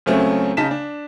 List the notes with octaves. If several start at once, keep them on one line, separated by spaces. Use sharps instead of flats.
C#2 F#3 A3 C4 C#4
C#3 D#4 A5 B6 E7
D4